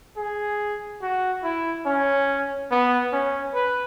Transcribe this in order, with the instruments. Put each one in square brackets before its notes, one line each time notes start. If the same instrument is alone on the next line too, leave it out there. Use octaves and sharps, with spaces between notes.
[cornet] G#4
F#4
E4
C#4
B3
C#4
B4